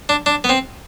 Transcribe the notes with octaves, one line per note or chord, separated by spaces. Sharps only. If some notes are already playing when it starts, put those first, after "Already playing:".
D4
D4
B3
C4